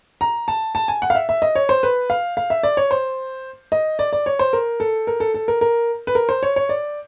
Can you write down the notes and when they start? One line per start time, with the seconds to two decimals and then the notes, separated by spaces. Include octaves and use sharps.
0.21 A#5
0.48 A5
0.75 A5
0.88 G#5
1.02 F#5
1.10 F5
1.15 E5
1.29 E5
1.42 D#5
1.55 C#5
1.69 C5
1.83 B4
2.10 F5
2.37 F5
2.50 E5
2.63 D5
2.77 C#5
2.91 C5
3.72 D#5
3.99 D5
4.13 D5
4.26 C#5
4.39 C5
4.53 A#4
4.80 A4
5.07 A#4
5.20 A4
5.34 A4
5.48 A#4
5.61 A#4
6.07 B4
6.15 A#4
6.29 C5
6.43 C#5
6.56 C#5
6.69 D5